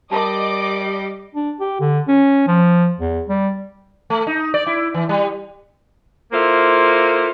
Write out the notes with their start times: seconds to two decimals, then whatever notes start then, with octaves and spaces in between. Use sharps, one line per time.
0.11 G3 A#4 D5 D#5 A5 D6
1.35 D4
1.60 G4
1.81 D3
2.07 C#4
2.47 F3
3.00 E2
3.29 G3
4.10 A3
4.27 D#4
4.54 D5
4.67 E4
4.94 E3
5.09 G3
6.32 A#3 E4 F4 A4 C5